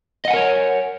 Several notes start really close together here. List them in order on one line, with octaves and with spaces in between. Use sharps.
D#5 F#5 G#5 A#4 C#5